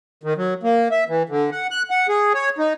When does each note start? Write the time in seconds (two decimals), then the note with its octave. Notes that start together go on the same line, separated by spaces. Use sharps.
0.23 D#3
0.37 F#3
0.63 A#3
0.91 E5
1.08 E3
1.29 D3
1.52 F#5
1.71 F#6
1.91 F#5
2.09 G#4
2.34 C#5
2.58 D#4